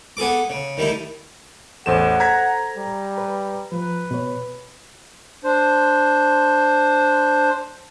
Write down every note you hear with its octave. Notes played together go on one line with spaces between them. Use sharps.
B3 G#4 A4 D6
C#3
D#3 G3 A3 E4
A1 E2 A4 C5 F#5 G#5 E7
A#5 G#6 B6
G3
B4
F3 B4
B2 C#5
D4 C5